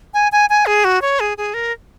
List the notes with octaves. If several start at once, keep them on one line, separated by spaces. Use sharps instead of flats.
G#5
G#5
G#5
G#4
F#4
C#5
G#4
G#4
A#4